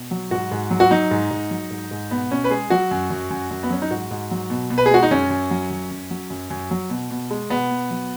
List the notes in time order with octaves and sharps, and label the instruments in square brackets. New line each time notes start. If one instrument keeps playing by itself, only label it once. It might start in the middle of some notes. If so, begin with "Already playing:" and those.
Already playing: [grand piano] B2
F#3
G#2 F#4
G#2
F#3
F#4
F#3 D#4
G#2
G#2
F#3
G#2
G#2
B2 B3
B2 C#4
B4
G#3 G#4
F#3 F#4
F#2
F#2
F#2
F#2
B3
F#3 C#4
D#4
G#2 F#4
G#2
F#3
B2
B2
B4
G#4
G#3 F#4
D#4
F#2 C#4
F#2
F#3
F#2
F#2
F#3
F#2
F#2
F#3
B2
B2
G#3
B2 B3
B2
F#3